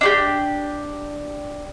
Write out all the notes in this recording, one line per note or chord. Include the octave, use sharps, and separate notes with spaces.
D4 F#4 G4